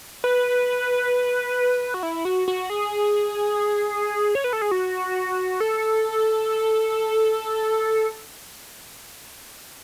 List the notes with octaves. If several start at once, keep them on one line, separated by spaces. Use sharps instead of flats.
B4
F#4
E4
F#4
F#4
G#4
C#5
B4
A4
G#4
F#4
A4